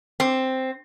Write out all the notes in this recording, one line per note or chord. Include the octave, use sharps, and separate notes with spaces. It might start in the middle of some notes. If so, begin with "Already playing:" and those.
C4